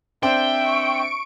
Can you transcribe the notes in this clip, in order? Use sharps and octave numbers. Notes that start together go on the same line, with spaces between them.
C4 D4 C5 E5 G5
C#6 D7